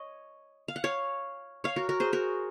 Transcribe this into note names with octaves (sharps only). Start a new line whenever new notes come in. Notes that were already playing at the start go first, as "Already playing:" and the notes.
Already playing: C#5 D#5
F5
F#5
C#5 F5
C#5 F5
F#4 A#4
F#4 A#4
G#4 C5
F#4 A#4